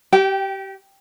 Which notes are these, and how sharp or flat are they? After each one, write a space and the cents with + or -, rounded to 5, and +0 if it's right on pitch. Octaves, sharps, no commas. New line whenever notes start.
G4 -25 G5 +0